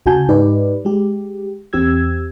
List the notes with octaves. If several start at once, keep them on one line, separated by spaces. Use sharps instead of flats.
D2 C#3 F#4 G#5 A5 G6
G#2 D#4 G4 B4 D5
G#3 G4
E2 C4 G4 E6 G#6